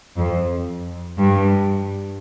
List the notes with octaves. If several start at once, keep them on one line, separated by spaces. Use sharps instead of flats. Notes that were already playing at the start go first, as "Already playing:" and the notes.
F2
G2